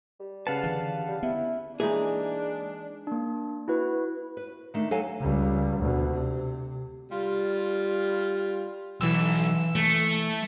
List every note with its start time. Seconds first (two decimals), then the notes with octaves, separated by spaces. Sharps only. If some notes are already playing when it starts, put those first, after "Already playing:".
0.20 G3
0.47 C#3 B4 F5 F#5 A5
0.64 D3 E3
1.08 G3
1.23 B3 E4
1.80 E3 G#3 A#3 D4 D#4 G#4
3.07 A#3 D4
3.68 E4 F#4 B4
4.37 B4
4.74 D#3 A3 D4
4.91 F#3 A4 F5 G#5
5.21 C#2 G3
5.80 D2 B2
6.11 C3
7.12 G3 F4
9.01 B1 E3 E6
9.75 A3